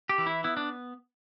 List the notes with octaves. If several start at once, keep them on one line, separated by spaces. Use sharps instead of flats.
G4
E3
E4
B3 E4
D4